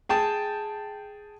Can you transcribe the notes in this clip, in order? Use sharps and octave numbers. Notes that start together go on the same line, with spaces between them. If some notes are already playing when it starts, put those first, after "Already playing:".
G#4 G5 A5